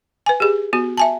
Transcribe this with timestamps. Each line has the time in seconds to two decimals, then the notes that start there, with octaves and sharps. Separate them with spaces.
0.26 B4 G#5
0.40 G4 G#4
0.73 B3 F#4
0.98 E5 G#5 A5